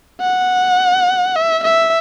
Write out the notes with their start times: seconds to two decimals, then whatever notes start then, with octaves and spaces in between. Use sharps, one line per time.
0.21 F#5
1.36 E5
1.64 E5